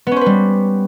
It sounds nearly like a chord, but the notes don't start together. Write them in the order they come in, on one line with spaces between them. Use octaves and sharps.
B3 C#4 C5 B4 G3